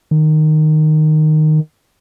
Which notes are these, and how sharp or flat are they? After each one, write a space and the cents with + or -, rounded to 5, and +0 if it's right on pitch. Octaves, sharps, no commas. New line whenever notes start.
D#3 -10